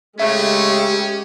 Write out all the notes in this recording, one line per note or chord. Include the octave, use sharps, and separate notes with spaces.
C#3 G#3 A3 C#4 G4 E5